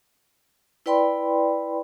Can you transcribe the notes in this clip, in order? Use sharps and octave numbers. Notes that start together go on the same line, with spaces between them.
E4 B4 D5 G5 B5 C6